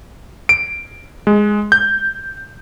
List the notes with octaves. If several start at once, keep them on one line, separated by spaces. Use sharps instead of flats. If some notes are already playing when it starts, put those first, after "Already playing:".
D7
G#3
G6